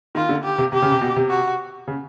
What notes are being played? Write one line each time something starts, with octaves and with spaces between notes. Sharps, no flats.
D#3 F4
D3
G4
C3
C3 G4
C#3
C3
B2
C3
F#4
C#3